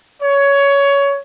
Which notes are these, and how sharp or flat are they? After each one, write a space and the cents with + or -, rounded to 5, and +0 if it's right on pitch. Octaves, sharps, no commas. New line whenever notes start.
C#5 +15